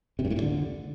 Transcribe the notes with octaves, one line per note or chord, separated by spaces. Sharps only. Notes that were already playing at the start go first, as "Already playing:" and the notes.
C3
G2
A2
A#2
D3